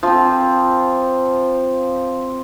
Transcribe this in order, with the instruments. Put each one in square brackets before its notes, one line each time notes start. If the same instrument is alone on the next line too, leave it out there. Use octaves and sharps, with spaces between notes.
[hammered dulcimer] F3 C4